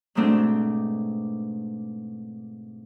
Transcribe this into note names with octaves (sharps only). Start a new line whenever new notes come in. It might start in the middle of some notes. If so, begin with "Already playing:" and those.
G#2 B2 G#3 A3 C4 D4